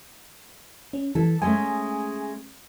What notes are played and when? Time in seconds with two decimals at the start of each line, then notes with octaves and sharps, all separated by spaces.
0.93 C#4
1.15 E3 A4
1.42 G#3 A3 C#4 G#5